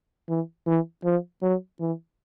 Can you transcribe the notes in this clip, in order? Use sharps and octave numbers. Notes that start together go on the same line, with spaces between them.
E3
E3
F3
F#3
E3